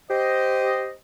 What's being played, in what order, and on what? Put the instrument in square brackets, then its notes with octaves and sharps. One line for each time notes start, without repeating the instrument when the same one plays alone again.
[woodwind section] G4 C5 D#5